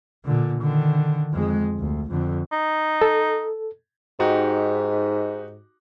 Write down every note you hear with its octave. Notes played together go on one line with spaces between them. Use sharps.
A#2 D3
D3 D#3
F2 G#3
D2
F2 D3
D#4
A4
G#2 D#4 F#4 G4